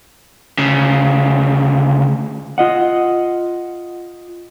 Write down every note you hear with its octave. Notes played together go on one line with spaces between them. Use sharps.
D2 C#3
F4 D#5 F#5